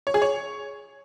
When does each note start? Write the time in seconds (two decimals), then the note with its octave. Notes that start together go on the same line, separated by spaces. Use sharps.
0.07 C#5
0.14 G#4
0.22 C#5